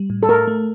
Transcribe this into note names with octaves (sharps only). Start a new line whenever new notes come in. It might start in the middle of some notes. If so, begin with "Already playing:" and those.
Already playing: G3
A2
A4
A3 A#4
A3